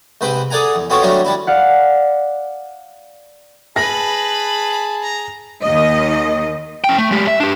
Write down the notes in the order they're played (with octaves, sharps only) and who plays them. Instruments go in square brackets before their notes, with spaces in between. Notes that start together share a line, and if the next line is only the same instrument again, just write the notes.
[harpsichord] G#2 C3 B4 C5 G5
G#4 A4 D5 F#5 G#5 A#5
E2
B3 C4 F4 F#4 A4 C#5
F#3 G3 A3 C#4 D4 F#4
G3 D4 E4
[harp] D5 F5 F#5
[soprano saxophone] G#4 [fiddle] B4 B5 [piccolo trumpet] A5 [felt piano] A#6
[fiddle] B5
A#5
[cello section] D#2 D#3 D#5
[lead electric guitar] C#4 G5
A3
G#3 G4
E5
D4 G4